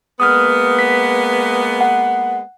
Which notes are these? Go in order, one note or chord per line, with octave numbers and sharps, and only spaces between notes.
G#3 A#3 B3 D#6 F6
B6
F#5